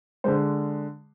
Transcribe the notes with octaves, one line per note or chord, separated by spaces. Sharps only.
D3 G#3 C5